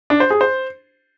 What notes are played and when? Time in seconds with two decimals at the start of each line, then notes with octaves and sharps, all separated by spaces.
0.10 D4
0.20 C5
0.31 G#4
0.41 C5